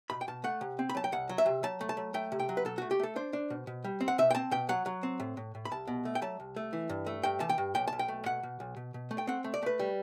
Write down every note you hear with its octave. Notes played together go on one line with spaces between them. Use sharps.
B2 B5
G5
B2 A5
A3 F#5
C3
C4
B5
F#3 A5
G5
C2 F#5
F#3
E5
C3
F#3 A5
A3
A5
F#3
A3 G5
C3
G5
F#3
B4
B2 A4
A3 F#4
G4
A3 A4
D4 C5
D4
B2
B2
G3
C4
F#5
B2 E5
G5
C4 A5
B2 G5
F#3 F#5
F#3
C4
A2
A2
A2
B5
C2 A5
B2
A3
G5
F#3 A5
C2
A3
E3
G2
A3
G2 G5
E3 A5
G5
G2
B1 G5
A5
B1
G5
A3
B2 F#5
B2
B1
B2
B2
A3
G5
C4 F#5
A3
D5
A3 B4
G3